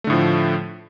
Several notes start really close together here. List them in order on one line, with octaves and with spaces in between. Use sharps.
A3 D3 A2 F3